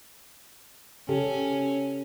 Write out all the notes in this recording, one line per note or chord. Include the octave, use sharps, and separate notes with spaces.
C#3 C#4 G4 A4